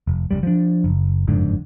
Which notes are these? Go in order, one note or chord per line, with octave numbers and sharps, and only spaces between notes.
F1
F#1 F#2 G3
F3 D4
F#1
F#1 F2 G#2 D3